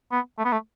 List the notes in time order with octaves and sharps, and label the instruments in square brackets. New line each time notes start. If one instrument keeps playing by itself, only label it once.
[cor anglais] B3
A3
B3
A3